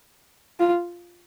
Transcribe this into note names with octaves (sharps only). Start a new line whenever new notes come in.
F4